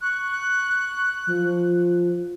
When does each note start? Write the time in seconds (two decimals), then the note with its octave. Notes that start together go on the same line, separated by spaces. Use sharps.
0.02 C#6 F#6
1.27 F3